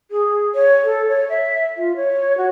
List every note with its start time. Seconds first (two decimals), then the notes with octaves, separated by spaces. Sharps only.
0.11 G#4
0.55 C#5
0.84 A4
1.08 C#5
1.29 E5
1.77 F4
1.96 C#5
2.37 F#4